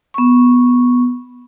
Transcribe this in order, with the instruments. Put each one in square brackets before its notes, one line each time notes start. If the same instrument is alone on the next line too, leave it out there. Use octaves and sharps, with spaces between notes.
[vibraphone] B3 C#6